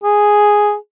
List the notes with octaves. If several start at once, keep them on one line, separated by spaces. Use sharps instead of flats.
G#4